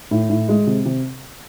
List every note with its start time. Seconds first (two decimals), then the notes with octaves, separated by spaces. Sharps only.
0.11 A2
0.29 A2
0.49 G#3
0.67 C3
0.85 C3